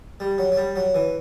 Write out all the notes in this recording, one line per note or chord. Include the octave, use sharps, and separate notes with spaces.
G3
F#3
F#3
G3
F#3
E3